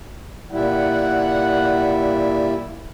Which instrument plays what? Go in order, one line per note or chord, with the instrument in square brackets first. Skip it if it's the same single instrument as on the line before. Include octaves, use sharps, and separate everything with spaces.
[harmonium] A#2 G3 E4 [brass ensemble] F#5